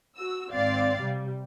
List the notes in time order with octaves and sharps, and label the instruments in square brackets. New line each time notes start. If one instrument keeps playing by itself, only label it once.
[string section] F#4 E6
G#1 C4 D5 F5 A6 C7
C3 G3